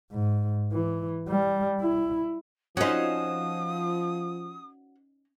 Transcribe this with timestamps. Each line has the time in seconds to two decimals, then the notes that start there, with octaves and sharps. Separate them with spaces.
0.12 G#2
0.72 E3
1.29 G3
1.81 E4
2.77 F3 C#4 D#4 F#4 C5 D#6